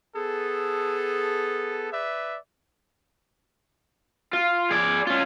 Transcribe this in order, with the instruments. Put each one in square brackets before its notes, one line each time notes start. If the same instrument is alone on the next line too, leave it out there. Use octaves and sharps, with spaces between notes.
[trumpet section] B3 A4 [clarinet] G#4
[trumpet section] B4 D5 E5
[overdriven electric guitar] F4
G#4 D5
C#4 F4